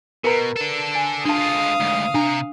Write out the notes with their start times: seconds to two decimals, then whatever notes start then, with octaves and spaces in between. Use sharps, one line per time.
0.24 B2 A#4 B4 A#5
0.56 D4 A4
0.95 G#5
1.25 G#3 D4 F4 F5 A5 D#6
1.80 D2 G#2
2.14 C3 D4 A#5